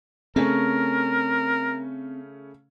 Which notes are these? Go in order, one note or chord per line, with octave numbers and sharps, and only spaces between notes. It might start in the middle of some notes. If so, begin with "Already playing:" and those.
C#3 A3 C4 C#4 A#4